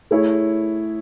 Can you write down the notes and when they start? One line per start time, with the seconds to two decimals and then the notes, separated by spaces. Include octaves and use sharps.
0.11 A3 E4 G#4 C#5